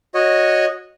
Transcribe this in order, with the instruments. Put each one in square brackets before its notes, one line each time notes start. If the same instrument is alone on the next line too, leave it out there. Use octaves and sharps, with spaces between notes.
[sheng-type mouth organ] F#4 C#5 D#5